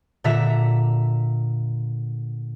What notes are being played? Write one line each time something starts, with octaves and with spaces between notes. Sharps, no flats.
A#2 D3 E5 A#5 B6